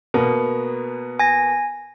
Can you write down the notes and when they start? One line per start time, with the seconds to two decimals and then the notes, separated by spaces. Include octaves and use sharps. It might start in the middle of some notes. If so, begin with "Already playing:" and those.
0.14 B2 A#3 B3
1.19 G#5 A#6